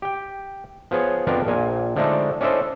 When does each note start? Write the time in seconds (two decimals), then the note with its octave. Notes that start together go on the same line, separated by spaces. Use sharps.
0.02 G4 G5
0.91 F3 B3 G#4 C#5
1.27 F2 F3 B3 D4 A#4 F5
1.46 A#1 A#2 G#5
1.96 D3 F3 G#3 A3 D4 D#4
2.41 C#4 D4 E4 A4 C5 D#5